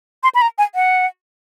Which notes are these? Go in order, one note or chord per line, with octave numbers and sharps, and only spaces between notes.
C6
B5
A#5
G#5
F#5